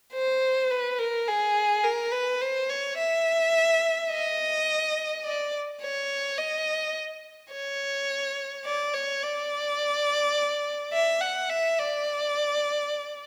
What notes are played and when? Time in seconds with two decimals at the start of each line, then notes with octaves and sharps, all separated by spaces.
0.14 C5
0.70 B4
0.99 A#4
1.28 G#4
1.84 A#4
2.12 B4
2.41 C5
2.69 C#5
2.98 E5
4.11 D#5
5.25 D5
5.81 C#5
6.38 D#5
7.52 C#5
8.65 D5
8.94 C#5
9.22 D5
10.93 E5
11.21 F#5
11.49 E5
11.78 D5